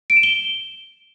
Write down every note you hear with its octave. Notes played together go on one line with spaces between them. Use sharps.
D7
E7
G7